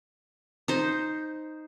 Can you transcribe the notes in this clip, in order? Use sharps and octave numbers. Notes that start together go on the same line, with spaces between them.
D#4 C5